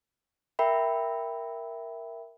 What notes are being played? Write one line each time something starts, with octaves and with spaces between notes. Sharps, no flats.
A#4 E5 G5 B5